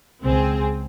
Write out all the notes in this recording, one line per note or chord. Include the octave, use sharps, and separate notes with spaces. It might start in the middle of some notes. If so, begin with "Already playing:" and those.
C#2 C4 G#4